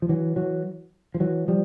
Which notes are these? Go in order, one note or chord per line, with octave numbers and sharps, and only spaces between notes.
F3
E3 F#3
E3 F#3
F3
E3 F#3
F3 G3